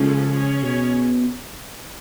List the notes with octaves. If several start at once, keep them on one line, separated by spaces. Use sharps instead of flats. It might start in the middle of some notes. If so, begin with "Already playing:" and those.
Already playing: C#3 F3 G#3 C#4 F4 A4
C#4 G#4 C#5
B2